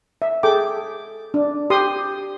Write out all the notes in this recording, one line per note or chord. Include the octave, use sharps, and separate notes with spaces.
E5
G#4 A4 G5 D6
D4
G4 C6 D#6